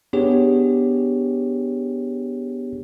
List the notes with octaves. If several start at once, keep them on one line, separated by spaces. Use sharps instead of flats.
B3 D4 G4 G#4 C#5